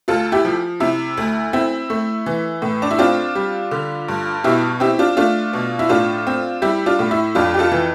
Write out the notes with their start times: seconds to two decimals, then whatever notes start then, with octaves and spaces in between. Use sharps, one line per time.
0.08 D2 F4 A4
0.32 E4 G4
0.45 F3
0.80 C3 E4
1.17 D2
1.53 C4 E4
1.90 A3
2.26 E3
2.62 A2
2.82 D4
2.91 E4
2.99 C4 D4 F4
3.35 G3
3.71 D3
4.08 G2
4.44 B2 E4 G4
4.80 C4 E4 G4
4.99 D4 F4
5.17 A3 D4 F4
5.53 B2
5.79 E4
5.89 A2 D4 F4
6.27 C4
6.62 G3 E4 G4
6.86 D4 F4
6.99 A2
7.11 E4
7.35 F2 D4 F4
7.54 G4
7.59 F4 A4
7.72 E3